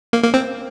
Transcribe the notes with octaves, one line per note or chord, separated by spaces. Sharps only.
A#3
A#3
C4